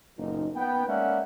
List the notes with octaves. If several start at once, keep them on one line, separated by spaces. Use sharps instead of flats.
F#1 B1 A#2 D#4
B3 G5
G#3 A#3 C#4 D5 E5 F#5